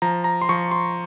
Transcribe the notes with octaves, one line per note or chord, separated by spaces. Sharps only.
F3 A#5
A#5
C6
F3 C#6
C6